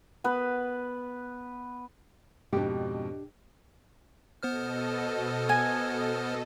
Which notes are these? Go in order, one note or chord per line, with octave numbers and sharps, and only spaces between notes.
B3 B4
F2 G#2 B2 D4 G4
B2 B3 A4 C5 D#5 F6
G#5